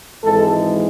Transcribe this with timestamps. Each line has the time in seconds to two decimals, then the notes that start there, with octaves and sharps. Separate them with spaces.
0.24 G#1 G#2 E3 G#3 A4